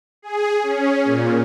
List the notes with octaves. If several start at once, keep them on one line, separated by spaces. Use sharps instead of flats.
G#4
C#4
A#2